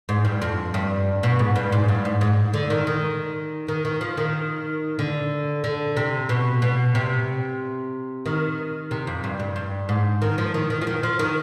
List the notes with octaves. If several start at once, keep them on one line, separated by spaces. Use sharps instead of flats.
G#2
G2
F2
G2
B2
G#2
G2
G#2
G2
G#2
G#2
D3
D#3
D#3
D#3
D#3
F3
D#3
D3
D3
C3
B2
B2
C3
D#3
C3
F2
G2
G2
G2
G#2
D#3
F3
D#3
D#3
F3
D#3
F3
D#3